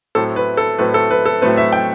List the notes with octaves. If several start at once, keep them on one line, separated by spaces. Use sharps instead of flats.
A2 F#3 A3 C4 A4
B4
A4
A2 F#3 A3 C4 B4
A4
B4
A4
A2 F#3 A3 C4 B4
E5
G5